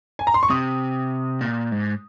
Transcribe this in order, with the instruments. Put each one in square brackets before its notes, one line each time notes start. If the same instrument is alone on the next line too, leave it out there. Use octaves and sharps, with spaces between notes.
[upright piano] G#5
A#5
C6
C#6
[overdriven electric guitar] C3 [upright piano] D#6
[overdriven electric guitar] A#2
G#2